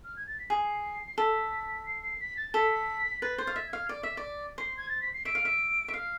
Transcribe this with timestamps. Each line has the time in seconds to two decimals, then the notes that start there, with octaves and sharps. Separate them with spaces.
0.04 F6
0.16 G#6
0.27 A6
0.39 B6
0.49 G#4 C7
1.18 A4 B6
1.86 C7
2.02 C7
2.20 B6
2.37 A6
2.54 A4 B6
3.22 B4 A6
3.38 C5
3.44 F5 A6
3.56 E5
3.67 G#6
3.73 F5
3.89 D5
4.03 E5
4.17 D5
4.58 C5 C7
4.77 G#6
4.89 A6
5.01 B6
5.14 C7
5.25 E5 D7
5.35 F5
5.45 E5
5.88 E5
5.93 F5 C7